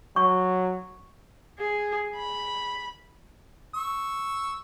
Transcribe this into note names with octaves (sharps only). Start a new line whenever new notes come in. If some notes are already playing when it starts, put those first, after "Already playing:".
F#3 C#6
G#4
B5
C#6 E6